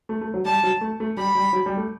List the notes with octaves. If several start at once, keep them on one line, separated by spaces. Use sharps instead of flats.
A3
A3
F#3
G3 A5
F#3
A3
A3
G3 B5
G3
F#3
G3
A3